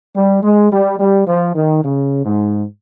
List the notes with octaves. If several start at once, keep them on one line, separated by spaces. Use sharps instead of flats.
G3
G#3
G3
G3
F3
D#3
C#3
G#2